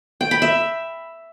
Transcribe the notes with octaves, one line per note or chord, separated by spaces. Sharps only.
G5
B5
E5